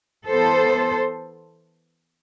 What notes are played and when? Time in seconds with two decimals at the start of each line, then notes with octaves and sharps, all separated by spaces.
0.27 E3 B3 A4 C5